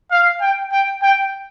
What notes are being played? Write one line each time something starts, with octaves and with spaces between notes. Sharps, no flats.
F5
G5
G5
G5